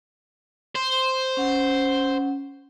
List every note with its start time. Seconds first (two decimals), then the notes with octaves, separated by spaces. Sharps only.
0.75 C5
1.37 C#4 F#5